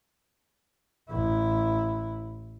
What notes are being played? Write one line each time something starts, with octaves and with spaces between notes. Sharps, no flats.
A1 E4